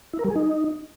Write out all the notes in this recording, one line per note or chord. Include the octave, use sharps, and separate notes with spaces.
E4
A#4
G3
G#4
D#4